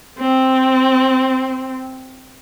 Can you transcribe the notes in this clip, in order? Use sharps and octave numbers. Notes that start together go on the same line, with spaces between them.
C4